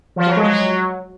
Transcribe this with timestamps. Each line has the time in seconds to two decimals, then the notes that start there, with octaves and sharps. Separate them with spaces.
0.16 F3
0.26 F#3
0.36 G#3
0.46 F#3